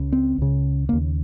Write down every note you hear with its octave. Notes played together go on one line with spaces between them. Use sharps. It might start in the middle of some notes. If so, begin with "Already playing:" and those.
Already playing: C#2 C#3
C4
C#2 C#3
D#2 C#3 A#3